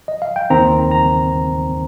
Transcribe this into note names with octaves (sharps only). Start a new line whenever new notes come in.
D#5
F5
G5
D#2 D#3 C4 A#5
A#5